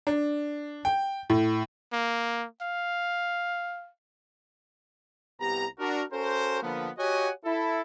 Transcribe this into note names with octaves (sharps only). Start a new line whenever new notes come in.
D4
G5
A2
A#3
F5
C2 B3 G4 A#5
D4 F#4 A#4
C#4 F#4 A4 A#4 C5
D3 F3 A#3 B3
F#4 G4 C#5 D#5 F#5 G#5
E4 A4